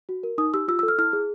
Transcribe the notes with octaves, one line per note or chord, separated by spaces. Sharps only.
F#4
A#4
D#4 D#6
G4 E6
F4 E6
E6
A4
F6
E4 F6
G#4